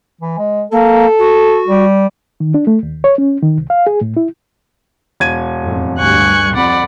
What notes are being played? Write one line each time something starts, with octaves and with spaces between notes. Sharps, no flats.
E3
G#3
A#3 A4
F#4
G3
D#3
D4
A3
D#2
C#5
C#4
D#3
C2
F5
G#4
A2
E4
E1 G#6 D#7
F2 A2
D2 G2 G3 G#5 C#6 F#6
F2 D5 F#5 B5